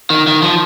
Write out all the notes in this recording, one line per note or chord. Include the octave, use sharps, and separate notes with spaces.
D#3
D#3
F3